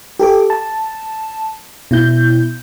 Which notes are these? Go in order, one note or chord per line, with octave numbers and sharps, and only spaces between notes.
G4 A4 D6
A5
B2 E4 G6